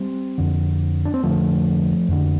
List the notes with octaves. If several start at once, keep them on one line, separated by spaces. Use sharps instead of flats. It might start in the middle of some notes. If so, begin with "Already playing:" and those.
Already playing: G3 C4
F2 D3
D4
C4
F2 D3 F3 A3
F2 D3